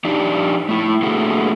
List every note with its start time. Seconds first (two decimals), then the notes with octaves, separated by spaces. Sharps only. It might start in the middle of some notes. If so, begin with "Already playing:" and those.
0.05 F3 D4 D#4 G4 D5
0.69 A3 E4
1.02 D3 A3 A#3 F#4 G#4 A4